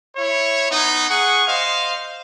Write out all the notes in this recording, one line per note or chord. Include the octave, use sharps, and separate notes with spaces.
E4 C#5
B3 D#4
G#4 F#5 C#6
C5 D#5 F5